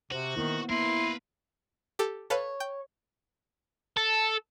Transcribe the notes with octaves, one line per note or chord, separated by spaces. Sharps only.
C3 F#4 C5
D#3 A#3 B3 E4
A#3 B3 E4 A#4 B4 C6
G4 A4
A4 B4 C#5 F5
G5
A4